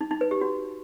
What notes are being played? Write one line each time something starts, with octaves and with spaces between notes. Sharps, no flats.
D#4
D#4
B4
G4
F#4